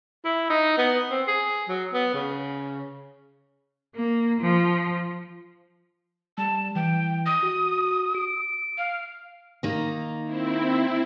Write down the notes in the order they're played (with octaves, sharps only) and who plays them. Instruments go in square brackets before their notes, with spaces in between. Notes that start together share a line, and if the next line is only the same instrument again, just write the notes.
[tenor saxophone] E4
D#4
B3
C4
G#4
F#3
B3
C#3
[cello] A#3
F3
[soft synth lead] G3 [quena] A5
[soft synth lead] E3 [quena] G5
[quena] D#6
[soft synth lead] F#4
D7
[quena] F5
[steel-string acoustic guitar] D#3 A#3 D#4
[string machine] C4 E4